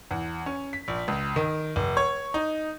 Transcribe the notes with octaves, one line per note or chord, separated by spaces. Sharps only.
E2
C#4
B6
A#1
C#2
D#3
F1
C#5
D#4